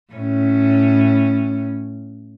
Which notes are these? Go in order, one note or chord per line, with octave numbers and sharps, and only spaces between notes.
A2 C#4